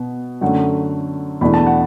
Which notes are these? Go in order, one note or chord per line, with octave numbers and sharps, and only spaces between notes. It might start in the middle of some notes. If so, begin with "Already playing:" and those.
Already playing: B2 B3
F#2 D3 A3 F#5
E2 B2 A3 D4 B5
A5
F#5